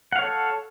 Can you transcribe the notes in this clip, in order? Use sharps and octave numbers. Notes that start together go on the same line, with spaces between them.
A4 C#5 F5 F#5